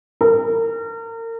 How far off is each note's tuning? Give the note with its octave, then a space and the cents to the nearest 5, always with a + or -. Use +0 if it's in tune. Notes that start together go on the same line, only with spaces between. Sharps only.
A#4 -35